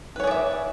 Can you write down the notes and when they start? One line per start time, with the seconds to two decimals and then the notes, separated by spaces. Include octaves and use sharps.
0.16 B4
0.20 C#5
0.23 G#4
0.27 D5
0.31 E5